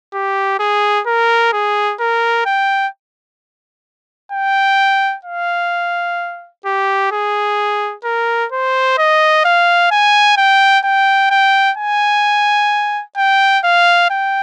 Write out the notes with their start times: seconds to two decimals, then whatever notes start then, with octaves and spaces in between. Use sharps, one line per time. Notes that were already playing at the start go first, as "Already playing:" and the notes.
0.13 G4
0.59 G#4
1.06 A#4
1.53 G#4
2.00 A#4
2.46 G5
4.32 G5
5.25 F5
6.65 G4
7.12 G#4
8.04 A#4
8.52 C5
8.98 D#5
9.45 F5
9.91 G#5
10.37 G5
10.84 G5
11.30 G5
11.77 G#5
13.17 G5
13.64 F5
14.10 G5